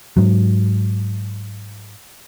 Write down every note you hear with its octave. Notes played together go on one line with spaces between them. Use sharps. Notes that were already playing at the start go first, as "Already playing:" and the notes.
G#2 F#3